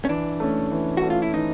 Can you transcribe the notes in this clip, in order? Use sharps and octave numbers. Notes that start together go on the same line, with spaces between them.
C#4
E3 D4
A3 C#4
E3
F#4
A3 C#4
F4
E4
E3 D#4